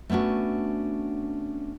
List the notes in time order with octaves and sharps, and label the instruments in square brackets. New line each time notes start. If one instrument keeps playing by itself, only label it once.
[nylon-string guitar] A3 B3 C#4 D4 F#4